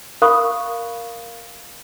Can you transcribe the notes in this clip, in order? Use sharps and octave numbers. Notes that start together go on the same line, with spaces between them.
A#4 F5 B5 C#6 D#6 F#6